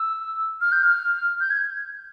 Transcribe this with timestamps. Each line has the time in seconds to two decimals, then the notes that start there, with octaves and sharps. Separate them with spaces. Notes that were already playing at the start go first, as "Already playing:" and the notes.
Already playing: E6
0.61 F6
0.72 G6
0.83 F6
1.40 G6
1.50 G#6